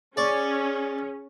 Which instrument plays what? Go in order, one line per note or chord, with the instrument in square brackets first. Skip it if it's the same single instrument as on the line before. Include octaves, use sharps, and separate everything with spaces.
[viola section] C#4 [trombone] G#4 [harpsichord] D5 C#6